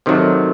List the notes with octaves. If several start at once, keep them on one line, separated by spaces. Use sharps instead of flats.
C3 D#3 F#3 A3